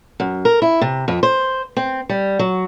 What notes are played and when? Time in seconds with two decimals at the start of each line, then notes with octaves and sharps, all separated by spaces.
0.20 F#2
0.45 A#4
0.62 E4
0.81 C3
1.08 F2
1.23 C5
1.77 C4
2.09 G3
2.39 F#3